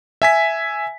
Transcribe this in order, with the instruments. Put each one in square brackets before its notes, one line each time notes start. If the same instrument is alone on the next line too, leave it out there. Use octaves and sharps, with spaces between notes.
[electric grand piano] E5 G#5 B6